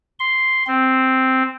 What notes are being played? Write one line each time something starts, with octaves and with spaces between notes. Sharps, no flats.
C6
C4